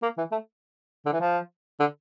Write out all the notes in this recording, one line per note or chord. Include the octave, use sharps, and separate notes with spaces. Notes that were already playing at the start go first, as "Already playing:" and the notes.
A#3
E3
A3
D3
E3
F3
D3